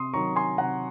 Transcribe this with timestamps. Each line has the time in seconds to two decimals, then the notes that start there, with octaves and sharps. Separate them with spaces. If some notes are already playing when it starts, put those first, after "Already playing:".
Already playing: C3 C6 D#6
0.13 D#3 F#3 A#5 C#6
0.36 G#5 C6
0.58 C3 F#5 A#5